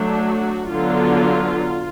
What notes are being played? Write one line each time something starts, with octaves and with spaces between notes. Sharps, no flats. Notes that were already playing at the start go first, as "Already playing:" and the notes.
Already playing: F#3 A3 D4
F#4
D3 F#3 B3 F4